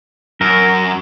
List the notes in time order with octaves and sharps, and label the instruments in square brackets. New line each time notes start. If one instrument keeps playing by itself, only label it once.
[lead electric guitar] F#2 [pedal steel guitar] A#4